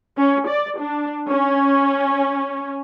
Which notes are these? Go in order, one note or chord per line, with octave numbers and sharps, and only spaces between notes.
C#4
D5
D4
C#4